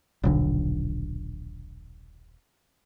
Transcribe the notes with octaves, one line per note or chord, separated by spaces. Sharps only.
D#1 B1 D3